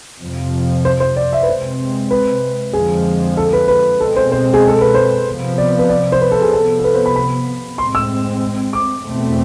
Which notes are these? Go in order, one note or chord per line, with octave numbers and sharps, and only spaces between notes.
F2 C3 F3
C5
C5
D5
E5
B4
C3 G#3 C4 C5
B4
F2 D3 F3 G#3 G#4
A4
B4
B4
B2 G#3 C4 A4
C5
C5
G#4
A4
B4
C5
C3 F3 B3
D5
B4
D5
C5
B4
A4
G#4
C3 F3 B3 A4
A4
B4
C5
B5
B5
A2 G#3 C4 C6
E6
D6
E2 B2 A3 C4